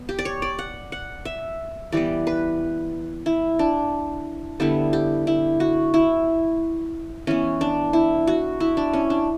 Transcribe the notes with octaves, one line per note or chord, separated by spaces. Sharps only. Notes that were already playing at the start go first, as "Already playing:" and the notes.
Already playing: B3
G4
D5
C#5
D5
F#5
F#5
E5
E3 G3 B3 D5
B4
E4
D4
D3 G3 B3 E4
G4
E4
F#4
E4
E3 B3 C#4
D4
E4
F#4
E4
D4
C#4
D4